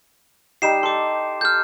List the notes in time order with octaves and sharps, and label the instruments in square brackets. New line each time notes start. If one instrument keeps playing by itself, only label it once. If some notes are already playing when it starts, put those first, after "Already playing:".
[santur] G3 D#4 G4 [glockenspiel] C7 E7
[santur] A4 [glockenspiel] C6 D6
[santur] A4 [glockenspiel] F6 G6